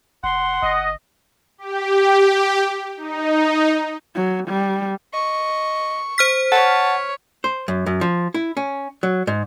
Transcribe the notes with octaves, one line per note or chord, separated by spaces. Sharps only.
F1 F#5 C6
G1 D#5
G4
D#4
F#3
G3
D#5 C#6
C5 F6 B6
C#5 F#5 A5
C5
F#2
F#2
F3
E4
C#4
F#3
G#2